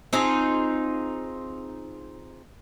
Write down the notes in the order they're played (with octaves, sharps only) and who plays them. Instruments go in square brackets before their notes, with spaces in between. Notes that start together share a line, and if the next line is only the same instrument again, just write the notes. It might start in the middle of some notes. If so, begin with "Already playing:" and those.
[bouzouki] C4 D#4 F4 G#4